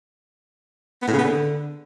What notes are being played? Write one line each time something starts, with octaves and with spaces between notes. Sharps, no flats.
B3
A2
C#3
B3
D3